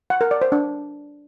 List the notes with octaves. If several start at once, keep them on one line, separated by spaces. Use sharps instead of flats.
F#5
A#4
D5
C5
D4